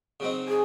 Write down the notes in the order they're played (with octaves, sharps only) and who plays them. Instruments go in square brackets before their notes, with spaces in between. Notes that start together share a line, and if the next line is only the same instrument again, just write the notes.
[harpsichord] C#3 F#3 C4 D#4
[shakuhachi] G#4